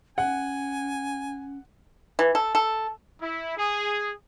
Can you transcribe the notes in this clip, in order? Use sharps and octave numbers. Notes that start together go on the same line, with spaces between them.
C#4 F#5 G#5
E3
A4
A4
E4
G#4